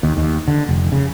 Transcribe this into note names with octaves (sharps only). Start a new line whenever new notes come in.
D#2
D#2
D3
F1
C#3